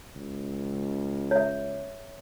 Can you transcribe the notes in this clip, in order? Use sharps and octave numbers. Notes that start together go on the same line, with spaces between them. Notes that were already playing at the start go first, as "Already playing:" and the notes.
C#2
C#5 E5